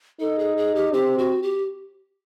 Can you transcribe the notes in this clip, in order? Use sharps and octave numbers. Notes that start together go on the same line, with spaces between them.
D#4 A4
G#4
G#4
G4
C4 G4
F#4
G4